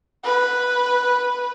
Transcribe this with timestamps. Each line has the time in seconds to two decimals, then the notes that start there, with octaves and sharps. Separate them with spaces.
0.24 B4